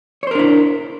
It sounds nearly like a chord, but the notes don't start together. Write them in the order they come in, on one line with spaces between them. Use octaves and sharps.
C#5 C5 A#4 D4 E4